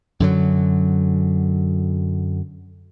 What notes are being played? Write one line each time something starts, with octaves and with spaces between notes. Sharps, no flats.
F#2 D3 F#3